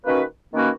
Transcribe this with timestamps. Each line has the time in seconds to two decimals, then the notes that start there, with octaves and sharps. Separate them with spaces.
0.04 D#3 A#3 C#4 F#4 B4
0.52 D#3 A#3 C#4 F#4 B4